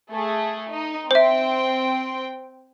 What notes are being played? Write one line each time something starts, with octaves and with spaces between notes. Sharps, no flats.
A3 G#4
D#4
C4 C5 E5 G5